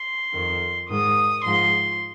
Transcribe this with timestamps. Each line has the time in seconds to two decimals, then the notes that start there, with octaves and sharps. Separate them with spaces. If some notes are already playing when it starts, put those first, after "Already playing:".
Already playing: C6
0.34 F2 D#3
0.89 G#2 D#3 D#6
1.44 G#2 F3 C6